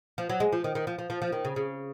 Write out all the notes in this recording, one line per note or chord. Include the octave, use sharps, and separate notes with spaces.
F3
F#3
G#3
F3
D#3
D#3
F3
F3
F3
F3
D#3
C#3
C#3